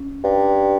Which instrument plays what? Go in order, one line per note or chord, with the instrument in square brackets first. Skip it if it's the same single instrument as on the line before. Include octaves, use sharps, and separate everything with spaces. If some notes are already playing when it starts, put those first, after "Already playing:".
Already playing: [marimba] C#4
[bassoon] G2